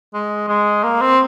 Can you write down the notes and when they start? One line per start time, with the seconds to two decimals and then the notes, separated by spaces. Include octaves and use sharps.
0.14 G#3
0.48 G#3
0.83 A#3
1.01 C4